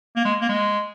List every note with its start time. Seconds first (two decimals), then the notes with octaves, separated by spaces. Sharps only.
0.16 A#3
0.25 G#3
0.41 A#3
0.49 G#3